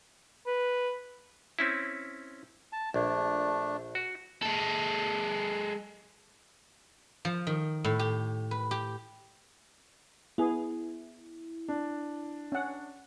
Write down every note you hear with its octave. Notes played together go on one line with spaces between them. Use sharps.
B4
C4 C#4 E4
A5
A#1 A3 D4
F#4
G#3 A4
F3
D#3
A2
G4
B4
G4
B3 E4 G#4
D4
C#4 F#5